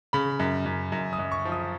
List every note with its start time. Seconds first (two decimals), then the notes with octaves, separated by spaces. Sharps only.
0.13 C#3 B5
0.39 F#2
0.66 F#2
0.92 F#2
1.13 D#6
1.19 F#2
1.32 C#6
1.45 F3
1.52 D#6